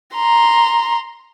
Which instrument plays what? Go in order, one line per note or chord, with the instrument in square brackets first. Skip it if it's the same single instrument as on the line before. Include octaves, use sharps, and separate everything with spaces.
[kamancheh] A#5 C6